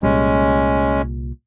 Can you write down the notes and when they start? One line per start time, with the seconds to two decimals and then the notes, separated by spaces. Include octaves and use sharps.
0.03 C2 A#2 G3 G#3 C#4